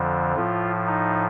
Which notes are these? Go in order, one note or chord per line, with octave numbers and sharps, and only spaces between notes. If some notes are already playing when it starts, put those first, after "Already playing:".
Already playing: F2 D3 F3
A2 F3 F4
D#4